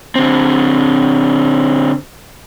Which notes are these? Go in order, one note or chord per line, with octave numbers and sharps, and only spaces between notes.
D3 C4